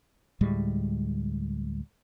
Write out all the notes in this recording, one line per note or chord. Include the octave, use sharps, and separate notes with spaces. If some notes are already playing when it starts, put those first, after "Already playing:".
D2 A2 G3 G#3